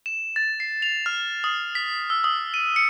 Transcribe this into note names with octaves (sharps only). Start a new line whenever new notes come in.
E7
A6
C7
F7
F6
D#6
B6
E6
D#6
D#7
C#7